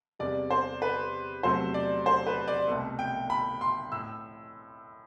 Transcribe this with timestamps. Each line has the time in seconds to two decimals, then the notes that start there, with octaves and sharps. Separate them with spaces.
0.19 E2 C3 G3 D5
0.50 C5
0.82 B4
1.43 E2 C3 F#3 A3 C5
1.74 D5
2.06 C5
2.27 B4
2.48 D5
2.67 C2 B2 A3
2.99 G5
3.30 B5
3.61 C6
3.92 A2 E6